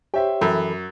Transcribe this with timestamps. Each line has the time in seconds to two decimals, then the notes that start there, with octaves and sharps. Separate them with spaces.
0.14 G4 C5 C#5 E5 G5
0.41 F#2 E3 A4 B5